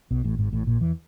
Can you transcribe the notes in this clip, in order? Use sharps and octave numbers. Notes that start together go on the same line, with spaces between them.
B1 B2
A1 A2
G#1 G#2
A1 A2
A#1 A#2
E2 E3